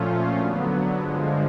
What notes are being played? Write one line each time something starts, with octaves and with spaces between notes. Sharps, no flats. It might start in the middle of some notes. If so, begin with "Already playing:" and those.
Already playing: A#2 F3 A3 C#4 F4
D3 F#3 B3
G2 D3 F3 G#3